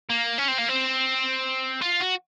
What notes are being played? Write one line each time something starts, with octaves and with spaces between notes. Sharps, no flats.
A#3
C#4
C4
A#3
C4
F4
F#4